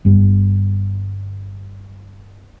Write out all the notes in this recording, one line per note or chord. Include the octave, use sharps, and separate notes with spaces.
G1 G2